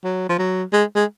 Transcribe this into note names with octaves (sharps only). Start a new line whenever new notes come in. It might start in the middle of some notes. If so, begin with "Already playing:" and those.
F#3
F3
F#3
G#3
G#3